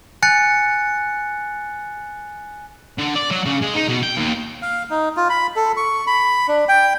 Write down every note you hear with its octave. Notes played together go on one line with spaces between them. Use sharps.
G#5 F#6 A6 C#7
D3
D5
F#3
C#3
G#3
D#4
B2
G5
D#2
F5
D#4
F4
B5
A4
C#6
B5
D4
G5